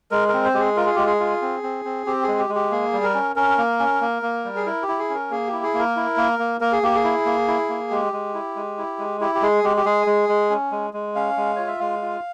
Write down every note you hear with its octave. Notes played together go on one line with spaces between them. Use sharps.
G#3 A#4
C4 A#4
C5
G#3 G4
G#4
F4 A#4
G#4
G#3 G4
G#4
F4
C4
C4
C4
C4 G4
G#4
G#3
G4
G#3
G4
A#3 G#4
G3
A#4
C#4
C#4 A#4
A#3
C#4
A#3
A#3
G3
G#4
E4 A#4
G4
E4
G#4
C#4 A#4
A#3 G#4
G4
E4
G#4
A#3
A#4
E4
A#3
A#3
A#3 A#4
G#4
A#3 G4
G#4
E4
A#3
E4
A#3
G#3 G4
G#3
E4
G#3
E4
G#3
E4 G4
G4
G#3 G#4
G#3 G4
G4
G#3 G#4
G#3
G#3
C#4
G#3
G#3
C#4 F5
G#3
F4 C#5
E5
G#3 F5
F4